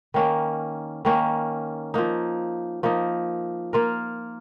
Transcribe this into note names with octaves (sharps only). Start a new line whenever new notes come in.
D#3 A#3 C#4
D#3 A#3 C#4
F3 A#3 D#4
F3 A#3 D#4
A#3 F4 A#4